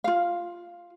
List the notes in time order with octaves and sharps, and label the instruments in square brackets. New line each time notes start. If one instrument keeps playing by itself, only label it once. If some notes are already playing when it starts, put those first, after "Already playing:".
[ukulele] F4 F5